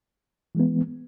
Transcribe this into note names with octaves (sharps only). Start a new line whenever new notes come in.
E3 G#3 B3